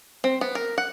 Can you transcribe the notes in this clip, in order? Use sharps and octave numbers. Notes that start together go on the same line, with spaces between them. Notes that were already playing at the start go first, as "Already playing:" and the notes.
C4
B3
A#4
F#5